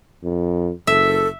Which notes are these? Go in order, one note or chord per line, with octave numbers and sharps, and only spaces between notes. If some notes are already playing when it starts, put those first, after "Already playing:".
F2
F#1 A4 E5